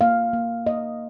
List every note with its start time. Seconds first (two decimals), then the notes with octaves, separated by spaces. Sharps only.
0.01 A#3 F5
0.33 A#3
0.67 A#3 D#5